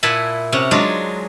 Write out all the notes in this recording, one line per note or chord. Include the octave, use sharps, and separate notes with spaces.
A#2 E4 F#5 G#5 A5 B5
C3 C#4 F#5
F#3 G#3 D4 D#4 F4 G#4